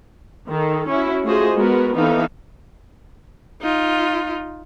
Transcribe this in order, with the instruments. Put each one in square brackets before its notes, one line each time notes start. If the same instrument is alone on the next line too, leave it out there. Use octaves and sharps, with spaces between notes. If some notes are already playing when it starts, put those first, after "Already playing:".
[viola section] D#3 A4
C#4 E4 F#4
A3 F4 F#4 G#4 C5 D#5
G#3 B3 F#4 A#4 B4
E3 B3 C4 D#4 A4 F5
[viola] D#4 F4